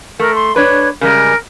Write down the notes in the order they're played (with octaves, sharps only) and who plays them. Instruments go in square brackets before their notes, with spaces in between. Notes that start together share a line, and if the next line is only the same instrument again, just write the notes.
[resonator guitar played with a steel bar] A3 [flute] A#4
[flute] C6
[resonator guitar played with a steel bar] D4 B4 [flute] C#5
[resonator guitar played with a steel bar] C#3 G3 G#3 [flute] A#4